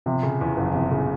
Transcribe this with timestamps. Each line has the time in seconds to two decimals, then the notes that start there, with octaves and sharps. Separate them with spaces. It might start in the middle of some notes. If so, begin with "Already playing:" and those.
0.06 C3 F3
0.23 C#3
0.41 E2
0.57 F#1
0.74 C3 F3
0.91 C#3